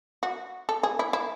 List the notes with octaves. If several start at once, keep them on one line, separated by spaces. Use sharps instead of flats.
F#4
A4
G#4
E4
E4